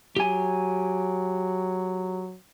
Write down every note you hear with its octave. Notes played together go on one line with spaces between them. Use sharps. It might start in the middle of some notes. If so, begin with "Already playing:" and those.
F#3 G4 G#5